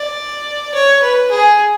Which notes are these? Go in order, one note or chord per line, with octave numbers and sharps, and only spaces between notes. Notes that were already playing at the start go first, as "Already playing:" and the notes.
Already playing: D5
C#5
B4
G#4